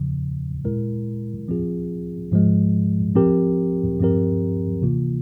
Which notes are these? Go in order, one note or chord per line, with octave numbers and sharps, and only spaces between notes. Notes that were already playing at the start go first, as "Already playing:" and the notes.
Already playing: E2 C#3 F3
A#2 G#3 E4 A#4
F3 C4 F4 G#4
G#2 F3 G#3
F3 C4 G4 A#4
G2 F3 C4 G4 A#4
C3 E3 A#3 F4